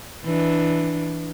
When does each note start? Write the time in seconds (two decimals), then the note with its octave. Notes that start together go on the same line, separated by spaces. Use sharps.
0.25 E3 D4